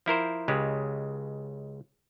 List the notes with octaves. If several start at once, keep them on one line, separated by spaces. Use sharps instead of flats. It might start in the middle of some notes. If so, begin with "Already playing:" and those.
F3 E4 A#4 C5
C#2 C#3 G#3 G4